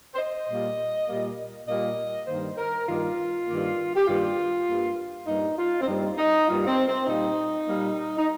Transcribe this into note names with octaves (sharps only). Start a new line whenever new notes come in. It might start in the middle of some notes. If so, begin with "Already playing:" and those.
C5
D#5
A#2 G3 A#3
A#2 G3 A#3
A#2 G3 A#3 D#5
G2 D#3 A#3 C5
A#4
G2 D#3 A#3 F4
G2 D#3 A#3
G4
G2 D#3 A#3 F4
G2 G3 A#3
G2 G3 A#3 D#4
F4
C4
G2 G3 A#3 D#4
D#4
G2 G3 A#3 F4
C4
C4
A#2 G3 A#3 D#4
A#2 G3 A#3
D#4